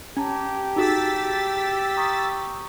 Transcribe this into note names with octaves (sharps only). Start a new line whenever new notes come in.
C#4 G4 A5 A#5 G#6
D#4 F#4 G#4 E6 A6 B6
A#5 C#6 D#6